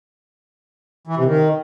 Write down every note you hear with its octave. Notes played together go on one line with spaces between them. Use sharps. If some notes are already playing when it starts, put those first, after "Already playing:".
E3
C3
D#3